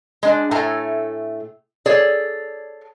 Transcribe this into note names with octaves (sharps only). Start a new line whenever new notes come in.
G#3 D4
A2 A3 G#5 A#5
G#4 A4 C#5 D5